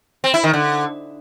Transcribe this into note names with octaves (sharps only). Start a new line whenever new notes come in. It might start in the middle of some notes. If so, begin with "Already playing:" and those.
C4
E4
D#3
D3